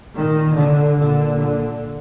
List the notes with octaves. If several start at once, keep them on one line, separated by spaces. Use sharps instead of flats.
A#2 D#3
D3
A#2 D3
D3